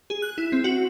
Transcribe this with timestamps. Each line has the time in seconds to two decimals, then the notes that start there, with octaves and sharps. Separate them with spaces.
0.10 G#4
0.22 F#6
0.38 E4
0.52 C4
0.64 F#4